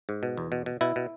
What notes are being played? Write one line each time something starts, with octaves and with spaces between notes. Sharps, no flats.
G#2
B2
E2
B2
B2
B2 E4
B2